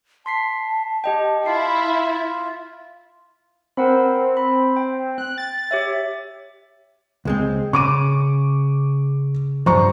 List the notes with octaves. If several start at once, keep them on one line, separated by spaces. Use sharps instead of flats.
A5 C6 B6 C7
G4 D#5 G5
E4 F4 C7
C4 A#4 F#5 B5
B5
G5
F#6
A6
G4 C#5 E5
C#2 G#3 C4
C#3 C#6 D6 D#7
G2 F3 C5 A#5 C#6